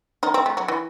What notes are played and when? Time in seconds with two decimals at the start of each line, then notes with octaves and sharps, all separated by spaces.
0.23 D#3 D#4
0.34 C4
0.46 A3
0.57 F#3
0.68 E3